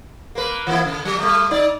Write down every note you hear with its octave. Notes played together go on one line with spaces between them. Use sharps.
A#3 B4
E3 A#3 E4
C#3
F#3
G3 A3
D#4 D5